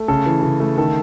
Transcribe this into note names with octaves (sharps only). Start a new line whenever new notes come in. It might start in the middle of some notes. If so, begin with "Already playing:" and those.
Already playing: A3
C#3 A4
E3
C#3
A3
D#3 A4